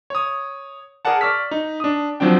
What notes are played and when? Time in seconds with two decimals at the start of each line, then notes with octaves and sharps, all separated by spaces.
0.10 C#5 D#6
1.05 G#4 A#4 D5 F#5 A5
1.21 D5 C#6 E6 F6 B6
1.51 D#4
1.80 D4 D#6
2.20 F3 F#3 C4 D4 G5